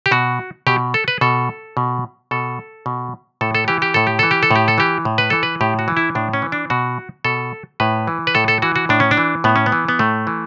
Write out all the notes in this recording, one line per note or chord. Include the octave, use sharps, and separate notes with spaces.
G4
B2 F#4
B2 G4
A4
B4
B2 A4
B2
B2 A4
B2
A2 A4
A4
E3 G4
G4
A2 A4
G4
E3 A4
G4
A4
A2 G4
A4
E3 G4
A2
B4
E3 A4
B4
A2 G4
F#4
E3
E4
A2 D4
C#4
E3
D4
B2 F#4
B2 A4
A2 B4
E3
B4
A2 A4
A4
E3 F#4
F#4
A2 D4
C#4
D4
E3
A2 B3
C#4
B3
E3
B3
A2 A3
E3